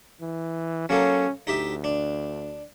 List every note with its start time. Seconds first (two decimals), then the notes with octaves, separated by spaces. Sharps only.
0.21 E3
0.89 F#3 A#3 C#4 A4
1.47 D2 D#4 G4 E5
1.84 D4